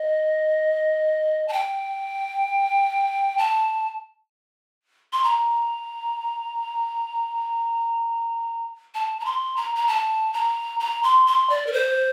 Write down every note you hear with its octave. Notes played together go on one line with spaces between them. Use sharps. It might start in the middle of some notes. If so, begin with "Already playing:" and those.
Already playing: D#5
A5
G5
A5
C6
A#5
A5
A#5
C6
A#5
A#5
A5
A#5
A#5
C6
C6
D5
A#4
C5